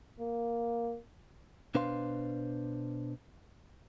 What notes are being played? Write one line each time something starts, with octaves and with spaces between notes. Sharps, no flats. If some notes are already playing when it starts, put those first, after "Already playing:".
A#3
B2 D4 B4 C5 F5 C6